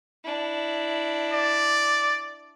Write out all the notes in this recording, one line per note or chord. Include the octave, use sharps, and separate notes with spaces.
D4 E4
D5